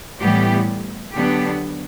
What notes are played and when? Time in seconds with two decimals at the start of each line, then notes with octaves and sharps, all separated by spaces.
0.21 A2 E3 G3 B3 G4
1.15 D3 F#3 B3 D4 G4